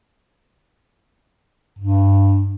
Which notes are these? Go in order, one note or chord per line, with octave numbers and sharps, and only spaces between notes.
G2